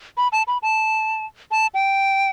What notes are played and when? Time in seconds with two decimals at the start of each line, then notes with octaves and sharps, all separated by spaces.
0.17 B5
0.32 A5
0.47 B5
0.62 A5
1.51 A5
1.74 G5